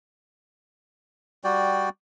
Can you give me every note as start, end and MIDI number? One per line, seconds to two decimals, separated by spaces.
1.44 1.89 55
1.44 1.89 66
1.44 1.89 74
1.44 1.89 79